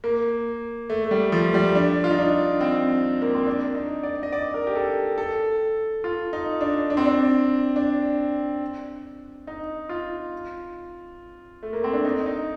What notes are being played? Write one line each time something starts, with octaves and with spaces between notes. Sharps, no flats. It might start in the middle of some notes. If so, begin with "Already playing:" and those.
A#3
A3
A3
G3
F3
G3
D4
F4
D#4
D4
C4
A#3
C4
D4
D#4
D5
D#5
D5
A#4
G4
A4
A4
F4
D#4
D4
D4
C4
D4
D4
D#4
F4
A3
A#3
C4
D4
D#4
D#4